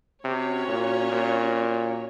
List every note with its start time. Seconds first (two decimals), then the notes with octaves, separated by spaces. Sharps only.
0.24 C3 C#4 F#4 C#5
0.68 A#2
1.12 A#2